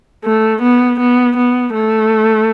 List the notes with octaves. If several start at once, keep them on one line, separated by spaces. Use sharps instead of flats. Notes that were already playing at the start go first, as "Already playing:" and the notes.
A3
B3
B3
B3
A3